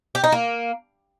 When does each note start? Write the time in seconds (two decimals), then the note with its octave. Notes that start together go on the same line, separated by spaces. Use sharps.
0.15 G4
0.24 D#4
0.32 A#3